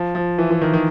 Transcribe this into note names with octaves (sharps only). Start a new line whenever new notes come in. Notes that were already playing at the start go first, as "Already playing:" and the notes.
Already playing: F3
F3
E3
E3
D#3
D#3